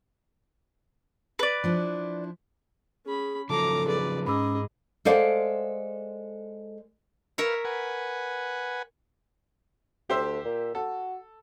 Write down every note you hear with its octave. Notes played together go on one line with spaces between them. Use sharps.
B4 D5
F3 D4 E4
C#4 G#4 B5
C#3 F3 F#3 A4 A5 A#5 D6
G#4 B4 D5
G#2 C#4 G#4 D#5 B5 D6 E6
G#3 A4 C5 D5 F5 F#5
A#4 B4 C#5 E5 F5
B4 F#5 G#5
D2 G4 C5 E5
A#2
F#4 A4